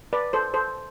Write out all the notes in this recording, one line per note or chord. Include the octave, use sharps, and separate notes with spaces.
B4 D5
A4 C5
A4 C5